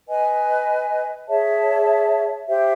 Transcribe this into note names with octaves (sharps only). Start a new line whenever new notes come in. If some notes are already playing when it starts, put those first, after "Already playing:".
B4 D#5 G#5
G#4 C#5 E5 A5
G4 C5 E5 G5